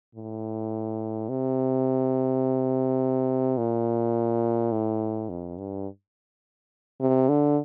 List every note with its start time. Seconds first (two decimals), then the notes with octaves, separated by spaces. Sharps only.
0.15 A2
1.29 C3
3.58 A#2
4.72 A2
5.29 F2
5.58 G2
7.00 C3
7.29 D3